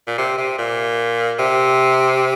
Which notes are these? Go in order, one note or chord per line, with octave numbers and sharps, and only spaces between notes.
A#2
C3
C3
A#2
C3